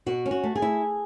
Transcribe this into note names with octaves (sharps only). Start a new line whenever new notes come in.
B2 F#4
C#4
F#4
A3
G#4
E4